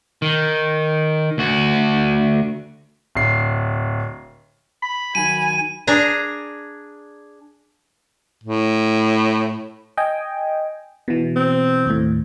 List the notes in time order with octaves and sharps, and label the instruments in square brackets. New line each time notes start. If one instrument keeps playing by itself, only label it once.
[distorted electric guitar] D#3
D2 F#4
[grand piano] D1 C7
[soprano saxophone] B5
[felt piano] D#3 F#3 [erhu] G#5 [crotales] D#7
[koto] D4 G#4 A#5
[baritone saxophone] A2
[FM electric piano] D#5 G5 G#5
B2 E3
[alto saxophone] C4
[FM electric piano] D#2 A2